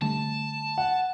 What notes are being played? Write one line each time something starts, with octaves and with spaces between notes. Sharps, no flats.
D3 G3 A3 A5
F#5